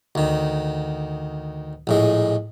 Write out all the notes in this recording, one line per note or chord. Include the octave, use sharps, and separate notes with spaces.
D2 D#3
A#1 A2 G#3